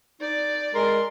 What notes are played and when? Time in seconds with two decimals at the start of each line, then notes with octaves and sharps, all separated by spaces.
0.21 D#4 D5
0.75 G#3 A#4 C6